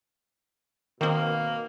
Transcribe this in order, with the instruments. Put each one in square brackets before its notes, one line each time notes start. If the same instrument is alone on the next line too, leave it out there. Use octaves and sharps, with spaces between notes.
[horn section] B2 A#3 [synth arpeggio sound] D#3 C4